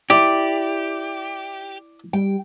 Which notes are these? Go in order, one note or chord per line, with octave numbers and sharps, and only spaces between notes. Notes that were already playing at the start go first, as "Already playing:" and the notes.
E4 G4 D5
G3 G5